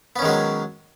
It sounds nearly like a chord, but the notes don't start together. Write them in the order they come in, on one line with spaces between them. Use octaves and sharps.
B3 C#4 D#3 G#3 F#3